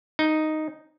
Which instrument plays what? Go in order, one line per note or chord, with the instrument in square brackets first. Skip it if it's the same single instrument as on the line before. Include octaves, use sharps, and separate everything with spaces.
[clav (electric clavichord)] D#4